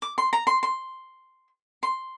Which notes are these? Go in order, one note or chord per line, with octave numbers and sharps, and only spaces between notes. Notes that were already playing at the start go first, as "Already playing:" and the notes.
D6
C6
A#5
C6
C6
C6